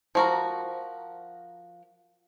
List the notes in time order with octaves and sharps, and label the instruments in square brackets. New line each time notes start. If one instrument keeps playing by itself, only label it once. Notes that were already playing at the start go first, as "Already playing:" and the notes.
[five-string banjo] F3 F#4 A#4